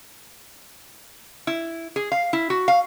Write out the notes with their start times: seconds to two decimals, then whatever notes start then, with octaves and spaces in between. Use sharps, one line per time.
1.47 E4
1.96 G#4
2.12 F5
2.33 E4
2.50 F#4
2.68 F5